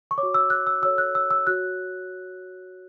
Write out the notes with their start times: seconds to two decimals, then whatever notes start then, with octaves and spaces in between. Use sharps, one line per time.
0.11 C#6
0.18 C#5 D6
0.23 F#4
0.34 E6
0.50 F#6
0.67 E6
0.82 F#4 A4 C#5 E6
0.98 F#6
1.15 E6
1.31 E6
1.47 F#4 C#5 F#6